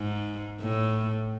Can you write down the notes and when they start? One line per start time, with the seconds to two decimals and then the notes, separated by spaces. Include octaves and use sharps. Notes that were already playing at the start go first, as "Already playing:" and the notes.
Already playing: G#2
0.61 A2